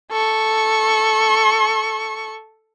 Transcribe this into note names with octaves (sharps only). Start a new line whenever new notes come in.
A4 C#6